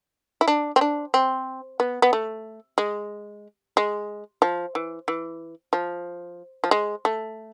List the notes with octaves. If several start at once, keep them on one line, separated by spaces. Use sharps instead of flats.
E4
D4
C4
D4
C4
B3
B3
A3
G#3
G#3
F3
E3
E3
F3
F3
G#3
A3